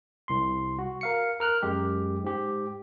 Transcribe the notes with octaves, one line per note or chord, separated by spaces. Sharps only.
C2 C6
F#4
A#4 F5 C#7
A#4 F6 F#6
F#2 G#3 G4
G#2 G4